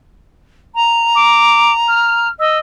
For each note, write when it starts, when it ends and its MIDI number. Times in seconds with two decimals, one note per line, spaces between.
0.75 2.28 82
1.15 1.72 86
1.88 2.29 89
2.39 2.59 75
2.39 2.57 88